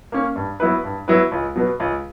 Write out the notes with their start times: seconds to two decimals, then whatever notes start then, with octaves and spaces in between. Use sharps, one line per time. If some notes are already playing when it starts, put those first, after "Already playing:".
0.12 A#3 C#4
0.36 G2
0.60 F#3 B3 E4 B4
0.84 G2
1.08 F#3 B3 E4 B4
1.32 C#2
1.56 B2 F#3 B3
1.80 C#2